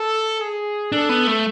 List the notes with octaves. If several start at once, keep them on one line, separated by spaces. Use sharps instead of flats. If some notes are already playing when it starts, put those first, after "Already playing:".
Already playing: A4
G#4
D4 A4
B3
A3